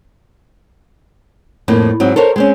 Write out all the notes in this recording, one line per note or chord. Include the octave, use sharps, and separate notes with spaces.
F2 A2 A#3
G#2 F#3 C4
A4 A#4 C5 C#5
G#3 C4 C#4